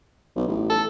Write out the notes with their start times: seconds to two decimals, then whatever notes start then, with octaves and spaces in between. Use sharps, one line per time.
0.36 B1
0.48 A1
0.69 A4